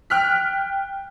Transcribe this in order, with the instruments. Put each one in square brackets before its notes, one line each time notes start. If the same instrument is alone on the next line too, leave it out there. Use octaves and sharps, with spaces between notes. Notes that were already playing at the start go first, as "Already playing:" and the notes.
[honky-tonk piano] G5 F6 F#6 B6